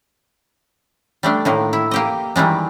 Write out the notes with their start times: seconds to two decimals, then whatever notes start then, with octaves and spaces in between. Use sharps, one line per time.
1.23 G3 A3 D4
1.45 A2 D#3 A#3
1.73 E4
1.91 A#3 G4 D#5
2.36 D#3 E3 G3 G#3